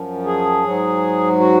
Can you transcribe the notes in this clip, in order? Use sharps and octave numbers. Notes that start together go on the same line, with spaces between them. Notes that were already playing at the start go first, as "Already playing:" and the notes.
Already playing: F#2 F3
G#4
G#2 F#3
F#4